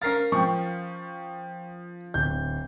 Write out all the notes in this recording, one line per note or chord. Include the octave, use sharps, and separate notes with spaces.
C#4 A#4 F5 A6 C7
F3 G5 C#6
D1 G6